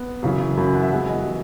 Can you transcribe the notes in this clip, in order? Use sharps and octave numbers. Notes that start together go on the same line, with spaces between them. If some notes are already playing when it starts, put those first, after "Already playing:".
Already playing: B3
F#2 C#3 E3
F#2 C#3 E3 B5
G#5
F#5
E5
F#2 E3 G#3 B3 F#5
D#5
E3 G#3 B3